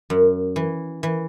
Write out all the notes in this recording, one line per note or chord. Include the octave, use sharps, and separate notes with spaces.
F#2
E3
E3